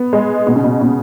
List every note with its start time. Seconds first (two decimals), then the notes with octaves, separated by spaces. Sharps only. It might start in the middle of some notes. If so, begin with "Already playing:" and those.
Already playing: B3
0.13 G#3
0.47 B2
0.56 C#3
0.64 B2
0.81 B2